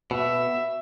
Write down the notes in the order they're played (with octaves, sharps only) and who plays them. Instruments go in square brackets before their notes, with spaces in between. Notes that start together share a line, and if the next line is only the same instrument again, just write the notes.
[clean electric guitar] B2 [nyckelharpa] E5